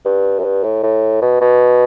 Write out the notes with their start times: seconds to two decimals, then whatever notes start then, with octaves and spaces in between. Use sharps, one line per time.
0.05 G2
0.39 F#2
0.44 G2
0.64 A2
0.83 A2
1.22 B2
1.41 B2